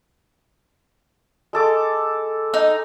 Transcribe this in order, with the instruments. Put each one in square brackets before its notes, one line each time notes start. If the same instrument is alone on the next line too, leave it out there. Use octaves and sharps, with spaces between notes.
[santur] G#3 A4 D6
[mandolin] D#4